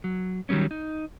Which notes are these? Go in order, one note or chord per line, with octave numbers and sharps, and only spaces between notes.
F#3
D#3 F#3 G3 B3 C#4
D#4